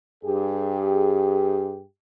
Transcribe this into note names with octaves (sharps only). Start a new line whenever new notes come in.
G2 G4 G#4